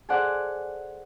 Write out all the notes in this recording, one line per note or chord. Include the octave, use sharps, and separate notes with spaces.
G#4 A4 C5 D5 F#5